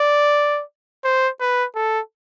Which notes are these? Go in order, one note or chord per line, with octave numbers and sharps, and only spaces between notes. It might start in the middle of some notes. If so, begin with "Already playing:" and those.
Already playing: D5
C5
B4
A4